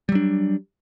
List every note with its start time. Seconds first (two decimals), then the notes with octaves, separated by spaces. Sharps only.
0.09 G3
0.12 F#3
0.15 D4